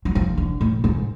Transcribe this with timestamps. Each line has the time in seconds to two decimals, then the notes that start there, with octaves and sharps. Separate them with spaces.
0.05 F#3
0.15 F3
0.38 D3
0.61 A2
0.84 G#2